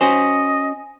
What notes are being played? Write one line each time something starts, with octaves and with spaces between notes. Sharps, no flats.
C#4 F#4 C5 D#5 G#5